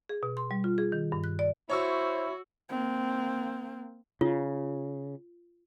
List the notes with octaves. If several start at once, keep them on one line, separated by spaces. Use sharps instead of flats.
G#4
B2
C6
G3
F4
G#4
D#3
G2
F#6
D5
E4 F#4 C5 C#5 C#6 E6
A#3 C4
C#3 F4